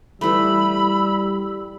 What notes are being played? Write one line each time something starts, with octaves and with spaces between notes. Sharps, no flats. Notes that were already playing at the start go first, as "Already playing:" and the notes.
E3 G3 A3 B5 E6